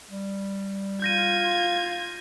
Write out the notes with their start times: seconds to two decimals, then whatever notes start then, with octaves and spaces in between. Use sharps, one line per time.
0.11 G3
1.02 F4 G6 G#6 A#6 D#7